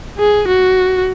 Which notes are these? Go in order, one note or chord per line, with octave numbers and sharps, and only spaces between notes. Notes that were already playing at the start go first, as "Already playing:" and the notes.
G#4
F#4